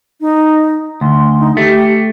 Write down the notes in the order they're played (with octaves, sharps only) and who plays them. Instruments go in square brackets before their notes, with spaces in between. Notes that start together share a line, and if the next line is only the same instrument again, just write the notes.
[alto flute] D#4
[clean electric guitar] D2 [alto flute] C6
[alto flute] D#4
[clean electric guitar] A3 [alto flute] G4